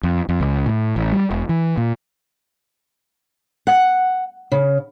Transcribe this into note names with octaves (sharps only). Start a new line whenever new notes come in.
F2
F2
C#2
A2
A1
G3
E1
E3
A#2
F#5
C#3